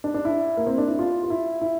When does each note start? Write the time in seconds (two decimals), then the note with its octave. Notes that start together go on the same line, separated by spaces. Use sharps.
0.04 D4
0.14 D4
0.25 E4
0.57 A#3
0.66 C4
0.78 D4
0.88 E4
0.99 F4
1.23 F4
1.30 E4
1.61 E4